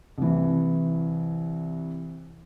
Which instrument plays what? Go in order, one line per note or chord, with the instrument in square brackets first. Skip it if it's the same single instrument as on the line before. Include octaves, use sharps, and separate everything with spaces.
[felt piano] C2 E3